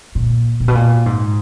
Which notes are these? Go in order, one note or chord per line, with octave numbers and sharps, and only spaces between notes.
A#2
A#2
B2
A#2
G#2